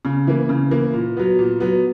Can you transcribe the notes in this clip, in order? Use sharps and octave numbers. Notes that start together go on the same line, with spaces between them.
C#3
E3 A#3
C#3
E3 A#3
A#2
F#3 B3
A#2
F#3 B3